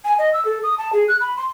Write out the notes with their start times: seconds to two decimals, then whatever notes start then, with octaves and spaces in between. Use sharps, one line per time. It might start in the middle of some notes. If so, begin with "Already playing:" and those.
0.05 G#5
0.19 D#5
0.33 E6
0.45 A4
0.63 D#6
0.78 A5
0.93 G#4
1.08 F#6
1.21 B5
1.37 C6